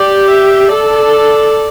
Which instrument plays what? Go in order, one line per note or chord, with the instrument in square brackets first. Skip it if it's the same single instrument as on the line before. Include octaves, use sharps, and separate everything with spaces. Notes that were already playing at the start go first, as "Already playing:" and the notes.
Already playing: [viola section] G4 [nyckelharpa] D5
[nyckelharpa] E5
[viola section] A4 [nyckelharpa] D5